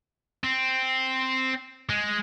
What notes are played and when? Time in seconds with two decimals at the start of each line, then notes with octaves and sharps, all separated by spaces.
0.44 C4
1.89 G#3